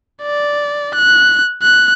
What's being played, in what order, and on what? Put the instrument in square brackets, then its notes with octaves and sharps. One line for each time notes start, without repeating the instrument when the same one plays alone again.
[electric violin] D5
F#6
F#6